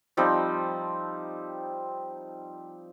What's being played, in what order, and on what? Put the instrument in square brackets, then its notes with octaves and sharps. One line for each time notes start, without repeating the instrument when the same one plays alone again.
[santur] F3 G3 C4 D#4